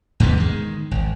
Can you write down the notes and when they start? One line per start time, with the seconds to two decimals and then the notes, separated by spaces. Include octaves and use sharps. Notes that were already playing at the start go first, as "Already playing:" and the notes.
0.20 E2 G#2 C#3 B3
0.37 D#3 G#3
0.91 G#1